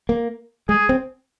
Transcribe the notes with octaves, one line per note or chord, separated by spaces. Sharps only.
A#3
G#3 G#4
C4